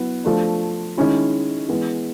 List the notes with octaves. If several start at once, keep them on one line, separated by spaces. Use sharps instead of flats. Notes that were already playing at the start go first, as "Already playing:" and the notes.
Already playing: F#3 B3 E4
F3 A3 D4
D#3 G#3 C#4 E4
E3 G#3 B3